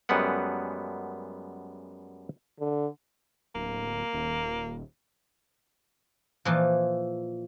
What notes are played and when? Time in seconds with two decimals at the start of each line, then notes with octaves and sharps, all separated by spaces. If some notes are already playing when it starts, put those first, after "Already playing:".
0.09 F#2 G3 G#3 B3 F#5
2.60 D3
3.55 D1 A#3
4.13 D#1
6.45 A#2 E3 F3